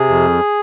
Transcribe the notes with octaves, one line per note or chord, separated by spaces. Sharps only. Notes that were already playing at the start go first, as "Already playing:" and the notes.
Already playing: C3 G#4
F2